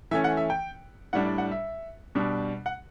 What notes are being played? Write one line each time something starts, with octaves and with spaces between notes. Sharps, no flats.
E3 A3 C#4 E5
F#5
E5
G5
A2 G3 D4 F#5
D5
F#5
E5
B2 G3 D4
F#5